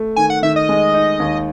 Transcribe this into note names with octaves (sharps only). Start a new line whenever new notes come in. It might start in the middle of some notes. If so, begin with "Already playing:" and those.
Already playing: A3
D#3 G#5
F#5
D#3 E5
D#5
G#3
D#4
D#2